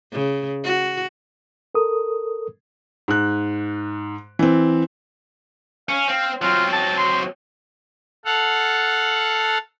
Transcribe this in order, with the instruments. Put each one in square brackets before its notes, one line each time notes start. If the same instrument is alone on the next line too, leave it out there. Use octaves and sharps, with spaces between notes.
[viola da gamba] C#3
F#4
[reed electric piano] A4 A#4 D#6
[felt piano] G#2 F#6
E3 C4
[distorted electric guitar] C#4 [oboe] F5
[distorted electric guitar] C4 [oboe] F5
[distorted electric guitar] F#3 C4 [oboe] F4
[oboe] A5
C6
[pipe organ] A4 F5 F#5